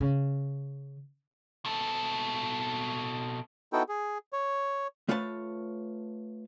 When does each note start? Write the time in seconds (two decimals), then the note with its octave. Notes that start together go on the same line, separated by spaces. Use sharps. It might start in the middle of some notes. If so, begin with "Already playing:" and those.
0.01 C#3
1.65 B2 A4
3.73 B3 D#4 E4 F#4 A4 G5
3.89 G#4
4.33 C#5
5.08 A3 F4 B4 C#5 A5